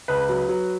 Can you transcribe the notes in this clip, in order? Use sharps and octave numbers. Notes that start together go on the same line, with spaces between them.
C#2 B4
F#3
F#3